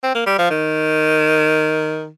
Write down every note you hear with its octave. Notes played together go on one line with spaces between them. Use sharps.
C4
A#3
G3
F3
D#3